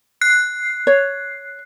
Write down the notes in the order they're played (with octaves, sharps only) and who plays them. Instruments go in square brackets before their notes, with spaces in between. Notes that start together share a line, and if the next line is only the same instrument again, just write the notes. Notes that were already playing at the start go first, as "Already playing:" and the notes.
[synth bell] F#6 C7
[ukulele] C#5